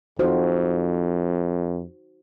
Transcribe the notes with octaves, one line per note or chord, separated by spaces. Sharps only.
F2 D#4 F#4 C5